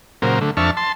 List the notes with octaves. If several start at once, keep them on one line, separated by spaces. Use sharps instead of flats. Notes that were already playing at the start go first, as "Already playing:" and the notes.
A#2 C#3 F#3 A#4 C5
D3 A3
F2 D4 E5 A5 C#6 F6
A5 C6